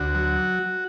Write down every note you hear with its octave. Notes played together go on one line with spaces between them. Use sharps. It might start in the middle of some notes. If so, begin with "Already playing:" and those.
Already playing: D2 F#4
F#3